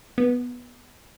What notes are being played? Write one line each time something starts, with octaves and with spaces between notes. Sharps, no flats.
B3